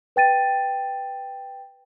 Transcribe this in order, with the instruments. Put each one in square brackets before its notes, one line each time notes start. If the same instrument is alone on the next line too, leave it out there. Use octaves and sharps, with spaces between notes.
[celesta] B4 G5 A6 D#7